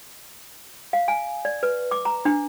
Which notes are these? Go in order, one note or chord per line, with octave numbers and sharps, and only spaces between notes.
F5
G#5
D5
B4
D6
A#5
D4